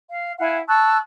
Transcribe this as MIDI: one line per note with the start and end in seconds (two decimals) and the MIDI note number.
0.10 0.33 77
0.39 0.57 64
0.39 0.57 77
0.39 0.57 78
0.39 0.57 80
0.67 0.97 81
0.67 0.97 85
0.67 0.97 88
0.67 0.97 90